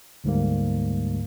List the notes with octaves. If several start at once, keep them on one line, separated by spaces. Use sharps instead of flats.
D2 G#2 G3 A#3